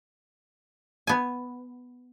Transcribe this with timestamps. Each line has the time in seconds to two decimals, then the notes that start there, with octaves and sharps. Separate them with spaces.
1.07 B3 G#5